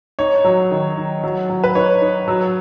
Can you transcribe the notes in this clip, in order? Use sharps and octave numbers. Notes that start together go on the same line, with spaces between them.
D#4 C#5
F#3
D#3
D#4
F#3
F#3
B4
D#4 C#5
D#4
F#3